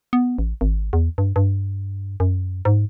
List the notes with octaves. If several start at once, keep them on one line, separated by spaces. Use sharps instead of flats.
B3
A1
G#1
E2
G2
G2
F#2
G#2